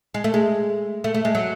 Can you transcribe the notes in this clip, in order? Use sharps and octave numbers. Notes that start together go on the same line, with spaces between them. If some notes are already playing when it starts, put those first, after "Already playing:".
G#3
A3
G#3
A3
A3
G#3
F#3